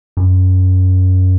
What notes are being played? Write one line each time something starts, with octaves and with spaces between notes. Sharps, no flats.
F#2